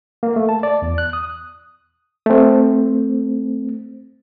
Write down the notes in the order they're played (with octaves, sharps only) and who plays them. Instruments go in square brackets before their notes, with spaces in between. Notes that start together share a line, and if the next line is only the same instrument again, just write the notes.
[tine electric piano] A#3
A3
A5
D5
E2
F#6
D#6
[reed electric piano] A3 C4